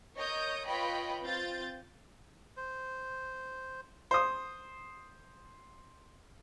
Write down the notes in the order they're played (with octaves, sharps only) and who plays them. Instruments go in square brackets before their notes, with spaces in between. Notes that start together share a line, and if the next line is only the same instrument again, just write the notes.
[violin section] A#4 C#5 D#5 D#6 G6
F4 B4 C#5 D#5 G5 B5
C4 F4 G6 A6
[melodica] C5
[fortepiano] C5 D#6